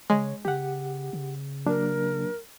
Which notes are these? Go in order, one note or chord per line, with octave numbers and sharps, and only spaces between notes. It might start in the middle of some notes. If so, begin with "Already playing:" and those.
C#3 G#3 C#5
C#3 G4 F#5
C#3
F#3 A#3 D4 A#4